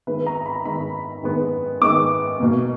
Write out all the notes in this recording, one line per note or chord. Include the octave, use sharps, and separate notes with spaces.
D#3 G#3 B3 B4
A#5
B5
D#3 G#3 B3 B5
D#3 G#3 B3
D#3 G#3 B3 D6
B2 A#3